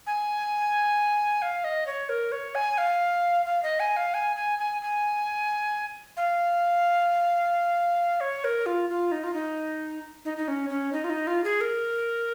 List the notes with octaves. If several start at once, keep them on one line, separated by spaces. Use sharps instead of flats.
G#5
F5
D#5
C#5
A#4
C#5
G#5
F5
F5
D#5
G#5
F5
G#5
G#5
G#5
G#5
F5
C#5
A#4
F4
F4
D#4
F4
D#4
D#4
D#4
C#4
C#4
D#4
F4
D#4
F4
G#4
A#4